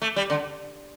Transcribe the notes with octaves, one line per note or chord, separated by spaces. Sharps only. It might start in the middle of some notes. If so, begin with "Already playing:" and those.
A3
G3
D3